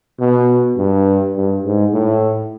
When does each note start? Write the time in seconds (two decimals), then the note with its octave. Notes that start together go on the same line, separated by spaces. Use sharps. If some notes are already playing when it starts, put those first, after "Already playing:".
0.20 B2
0.78 G2
1.36 G2
1.64 G#2
1.93 A2